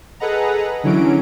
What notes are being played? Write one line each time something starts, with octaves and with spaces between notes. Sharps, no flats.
G#4 A4 B4 D#5 F#5 A#5
D3 E3 F#3 C#4 D7